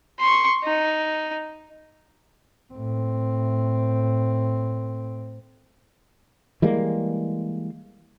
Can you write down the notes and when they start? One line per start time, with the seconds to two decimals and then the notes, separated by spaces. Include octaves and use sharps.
0.19 C6 C#6
0.64 D#4
2.74 A2 C4
6.62 E3 G3 G#3 A#3